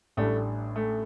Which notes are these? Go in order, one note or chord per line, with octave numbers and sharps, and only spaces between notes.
A1 A2 G3 A3 D4
A3